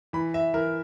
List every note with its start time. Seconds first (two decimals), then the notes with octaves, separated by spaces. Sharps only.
0.13 E3 B5
0.34 E5
0.54 E3 A#4